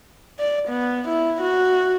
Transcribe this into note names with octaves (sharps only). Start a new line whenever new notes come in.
D5
B3
E4
F#4